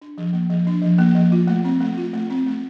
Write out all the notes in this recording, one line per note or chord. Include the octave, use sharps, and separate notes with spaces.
D4
F3
A#3
F3
D4
F3
A#3
F3
F4
A3
C4
A3
F4
A3
C4
A3